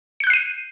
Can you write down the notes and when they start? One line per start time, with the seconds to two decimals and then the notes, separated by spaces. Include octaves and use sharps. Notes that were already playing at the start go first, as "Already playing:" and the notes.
0.20 C#7
0.24 G6
0.27 F#6
0.30 C7
0.33 D#7